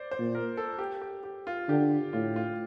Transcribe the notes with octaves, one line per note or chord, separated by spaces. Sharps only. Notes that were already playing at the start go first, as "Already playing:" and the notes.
Already playing: C5 D5
C5
A#2
A#4
A4
G4
G4
G4
F4
D3 G4
A2 F4
F4